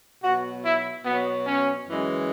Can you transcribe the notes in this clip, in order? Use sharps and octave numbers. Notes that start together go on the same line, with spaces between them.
B2 F#3 F#4
E4
B2 F#3 B3
C#4
F#2 E3 G#3